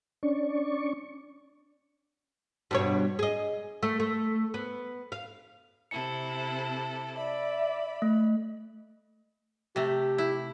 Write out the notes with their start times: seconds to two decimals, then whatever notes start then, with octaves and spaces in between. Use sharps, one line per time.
0.23 C#4 D4 D5 C#6
2.71 G2 B2 C#5
3.19 G#4 D#5
3.83 A3
4.00 A3
4.54 B3
5.12 F5
5.91 C3 E4 A4 C#7
7.18 D5 E5 B5
8.02 A3
9.76 C3 A3 G4
10.18 E4